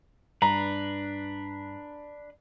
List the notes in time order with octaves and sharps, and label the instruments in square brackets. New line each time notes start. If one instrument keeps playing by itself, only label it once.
[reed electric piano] G2 [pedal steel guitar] D4 B4 [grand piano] A#5